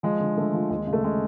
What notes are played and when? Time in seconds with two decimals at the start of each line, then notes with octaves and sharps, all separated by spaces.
0.03 F3 G#3
0.20 D3
0.37 D3 A3
0.54 F3
0.70 D#2 G#3
0.87 C#3
0.93 A3
1.03 C#3 G#3